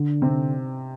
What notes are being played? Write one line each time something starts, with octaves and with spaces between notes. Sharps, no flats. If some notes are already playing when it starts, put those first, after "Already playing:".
Already playing: D3
C3 C4